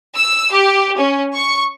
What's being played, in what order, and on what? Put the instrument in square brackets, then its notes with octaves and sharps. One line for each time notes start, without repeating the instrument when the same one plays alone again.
[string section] E6
G4
C#4
C#6